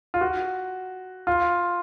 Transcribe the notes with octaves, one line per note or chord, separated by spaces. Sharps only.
F4
F#4
F4